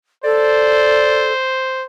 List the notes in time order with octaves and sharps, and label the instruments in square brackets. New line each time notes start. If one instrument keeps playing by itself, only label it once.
[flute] A4 [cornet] C5 [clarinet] D5